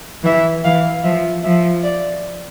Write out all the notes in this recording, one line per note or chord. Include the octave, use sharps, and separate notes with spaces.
E3 E5
E3 F5
F3 E5
F3 E5
D5